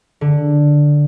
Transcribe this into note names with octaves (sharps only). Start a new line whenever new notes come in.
D3